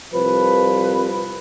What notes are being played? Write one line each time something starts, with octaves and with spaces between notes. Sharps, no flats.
C2 F3 B4